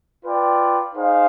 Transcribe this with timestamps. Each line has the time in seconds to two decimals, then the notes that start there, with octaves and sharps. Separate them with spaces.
0.24 F4 B4 D5 G5
0.94 D#4 G#4 C5 F5